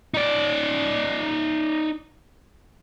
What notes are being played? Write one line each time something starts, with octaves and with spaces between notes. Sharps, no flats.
D#4 D5